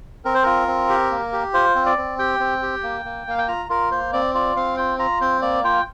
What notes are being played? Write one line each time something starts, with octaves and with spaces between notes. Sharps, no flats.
C4 A#4
C5
F4 A#4
C4
G4
A#3
G4
F4 C5
C4
D5
C4
G4 G5
C4
G4
A#3
A#3
A#3 F5
G5
F4 A#5
F4 A#4
A#3 C5
C4 D5
F4 D5
C4 F5
F4 G5
F4 A#5
C4 C5
A#3 D5
F4 G5